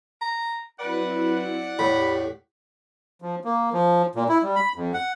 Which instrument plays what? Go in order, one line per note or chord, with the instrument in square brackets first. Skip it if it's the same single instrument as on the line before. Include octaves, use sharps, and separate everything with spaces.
[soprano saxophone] A#5
[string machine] F#3 C4 E4 [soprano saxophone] B4 [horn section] D5 F#5
[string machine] E2 G4 B6 [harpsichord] A2 [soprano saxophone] B5
[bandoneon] F3
A#3
F3
A#2
E4
G3
B5
F2
F#5